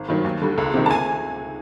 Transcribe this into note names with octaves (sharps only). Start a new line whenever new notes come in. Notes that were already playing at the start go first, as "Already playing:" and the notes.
Already playing: G#1
G2 D#3 F#3
D#2
D3 G3
C#2
C3 D#3
A5
G#5